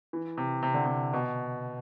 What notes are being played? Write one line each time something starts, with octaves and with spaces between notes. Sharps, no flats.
E3
C3
C3
D3
C3
B2